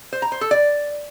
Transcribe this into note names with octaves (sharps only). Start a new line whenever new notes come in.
C5
A#5
C5
A4
D5